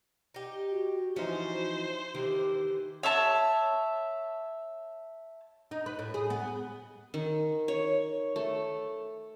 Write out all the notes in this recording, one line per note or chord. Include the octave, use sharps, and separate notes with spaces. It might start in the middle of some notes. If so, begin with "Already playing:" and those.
D#4 G4
F#4
E3 F3 C#4 D#4 C5
D#3 E3 G4
C#5 E5 A5 A#5
D#4
B4
A2
G#4
B3
D#3
C#5
A3